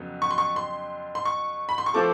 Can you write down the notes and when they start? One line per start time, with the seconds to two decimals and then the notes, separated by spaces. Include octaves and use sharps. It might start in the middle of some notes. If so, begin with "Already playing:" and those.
Already playing: F2 C#3 F#3 B3
0.22 C#6
0.31 C6
0.38 C#6
0.56 C6
1.15 C6
1.25 C#6
1.69 B5
1.78 C6
1.86 C#6
1.94 F3 A3 C4 F4 A4 D6